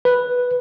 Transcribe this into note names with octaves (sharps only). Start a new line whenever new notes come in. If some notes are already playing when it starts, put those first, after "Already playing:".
B4